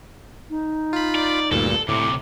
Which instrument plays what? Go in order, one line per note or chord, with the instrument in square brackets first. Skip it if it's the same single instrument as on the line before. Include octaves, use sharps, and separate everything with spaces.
[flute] D#4
[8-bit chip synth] F4 B5
[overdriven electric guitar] D5
[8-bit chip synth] D2 G2 A#2 [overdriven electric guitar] A4
[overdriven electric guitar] D2 C3 [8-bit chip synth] A2 [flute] D6